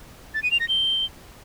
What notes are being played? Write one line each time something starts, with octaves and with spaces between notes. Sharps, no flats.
A6
D#7
F7
A#6
G7